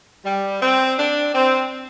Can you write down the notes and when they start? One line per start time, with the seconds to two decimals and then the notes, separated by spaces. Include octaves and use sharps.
0.25 G3
0.62 C4
0.98 D4
1.34 C4